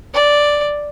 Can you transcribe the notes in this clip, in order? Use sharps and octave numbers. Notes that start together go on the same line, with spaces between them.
D5